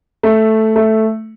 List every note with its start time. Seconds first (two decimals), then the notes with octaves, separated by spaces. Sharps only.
0.23 A3
0.76 A3